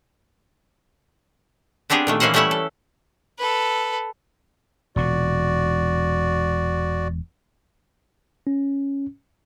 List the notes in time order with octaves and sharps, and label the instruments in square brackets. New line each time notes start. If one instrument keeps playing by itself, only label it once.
[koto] B3 C4 D4 G4 G#4
A#2 D#3 A3
A#2 E3 A#3 C#4 C5 F#5
G3 A3 C#4 E4 E5 F#5
A4
[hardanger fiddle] A4 B4
[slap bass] E1 A#2 [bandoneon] F#4 D5
[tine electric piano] C#4